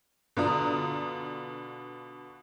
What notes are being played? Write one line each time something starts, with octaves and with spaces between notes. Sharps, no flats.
B2 D3 F4 D5 A#5 D#6